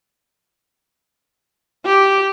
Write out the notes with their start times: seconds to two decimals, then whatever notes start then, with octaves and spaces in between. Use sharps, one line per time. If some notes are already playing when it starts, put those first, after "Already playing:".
1.85 G4